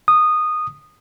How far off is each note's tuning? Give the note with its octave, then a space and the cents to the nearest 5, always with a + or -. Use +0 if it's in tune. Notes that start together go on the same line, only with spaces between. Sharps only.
D#6 -15